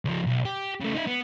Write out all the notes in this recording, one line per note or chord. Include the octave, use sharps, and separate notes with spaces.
C#2 F3
B1
G4
C#3 A3
D#4 E5
B3